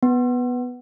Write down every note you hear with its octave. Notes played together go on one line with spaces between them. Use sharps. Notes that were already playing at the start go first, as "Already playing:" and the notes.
B3